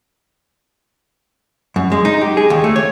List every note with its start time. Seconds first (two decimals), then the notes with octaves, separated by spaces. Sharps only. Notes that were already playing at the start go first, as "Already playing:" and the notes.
1.76 F#2
1.92 G#3
2.05 D#4
2.21 G4
2.37 G#4
2.50 D#2
2.64 A3
2.76 C#5